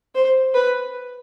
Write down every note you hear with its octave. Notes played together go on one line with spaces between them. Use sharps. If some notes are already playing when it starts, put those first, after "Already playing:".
C5
B4